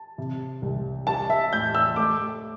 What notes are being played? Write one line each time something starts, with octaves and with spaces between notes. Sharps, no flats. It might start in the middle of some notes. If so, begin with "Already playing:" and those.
Already playing: A5
C3
C2
G3 A5
E5
A2 G6
E6
A3 D6